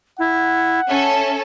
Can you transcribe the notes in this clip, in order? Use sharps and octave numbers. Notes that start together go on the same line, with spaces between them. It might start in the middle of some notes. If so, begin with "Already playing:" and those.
E4 F#5
C#4 A4 E5